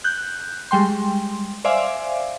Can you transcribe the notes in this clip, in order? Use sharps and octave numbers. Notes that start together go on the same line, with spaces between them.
F#6 G6
G3 G#3 G5 C6
C5 D5 E5 F5 G#5 D6